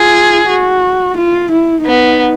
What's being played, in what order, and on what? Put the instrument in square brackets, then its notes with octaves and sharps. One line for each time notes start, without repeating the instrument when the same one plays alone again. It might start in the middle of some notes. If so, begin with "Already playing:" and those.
Already playing: [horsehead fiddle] F4 [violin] G#4
[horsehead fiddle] F#4
F4
E4
[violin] B3 [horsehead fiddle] D#4